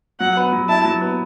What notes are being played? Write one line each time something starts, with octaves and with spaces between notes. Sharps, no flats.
F#3 F#5
B3
F#3
E4 A5
F#3
B3